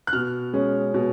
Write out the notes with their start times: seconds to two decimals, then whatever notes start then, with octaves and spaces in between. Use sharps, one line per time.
0.07 F#6
0.13 B2 F6
0.53 G#3 C#4
0.94 B2